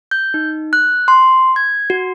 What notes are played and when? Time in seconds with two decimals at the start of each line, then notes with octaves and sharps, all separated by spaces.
0.11 G6
0.34 D#4
0.73 F#6
1.08 C6
1.56 G#6
1.90 F#4